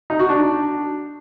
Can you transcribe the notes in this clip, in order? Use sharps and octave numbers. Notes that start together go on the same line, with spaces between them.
D#4
F#4
D4